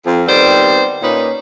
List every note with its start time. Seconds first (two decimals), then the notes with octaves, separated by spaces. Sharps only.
0.06 F2
0.27 D#3 G3 B3 C4 C5
1.02 A#2 A#3 C#4 D#4 B4